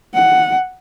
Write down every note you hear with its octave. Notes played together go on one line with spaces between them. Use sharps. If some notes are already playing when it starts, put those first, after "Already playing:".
F#5